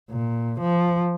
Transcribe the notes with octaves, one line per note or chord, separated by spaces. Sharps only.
A#2
F3